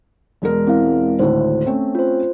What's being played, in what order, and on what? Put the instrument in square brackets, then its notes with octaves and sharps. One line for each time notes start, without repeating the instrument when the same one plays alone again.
[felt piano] E1 G#3 A#4
[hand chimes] C4 E4 F5
[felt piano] G#1 D2 A2 [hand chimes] C5
[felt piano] A3 C4 C#4
[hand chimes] F4 C5